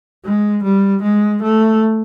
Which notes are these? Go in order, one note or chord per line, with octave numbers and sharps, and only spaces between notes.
G#3
G3
G#3
A3